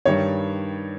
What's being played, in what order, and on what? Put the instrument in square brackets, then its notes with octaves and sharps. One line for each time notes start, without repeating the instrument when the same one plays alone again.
[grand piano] G2 D#3 G3 C#5